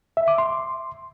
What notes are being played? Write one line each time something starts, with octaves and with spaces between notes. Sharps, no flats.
E5
D6
C6